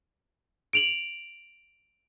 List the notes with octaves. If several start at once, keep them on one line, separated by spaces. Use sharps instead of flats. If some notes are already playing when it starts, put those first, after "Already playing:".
D7 F7 F#7